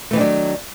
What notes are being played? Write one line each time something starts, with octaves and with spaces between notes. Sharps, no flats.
D#3 E3 F#3 A3 D4